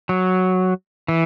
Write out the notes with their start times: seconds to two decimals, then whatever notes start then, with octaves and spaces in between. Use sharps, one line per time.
0.09 F#3
1.08 E3